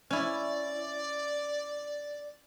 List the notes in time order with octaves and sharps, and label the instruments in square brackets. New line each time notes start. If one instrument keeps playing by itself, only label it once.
[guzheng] C#4 E4 [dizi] D5